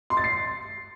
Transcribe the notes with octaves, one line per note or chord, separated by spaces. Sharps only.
C6
A6
C7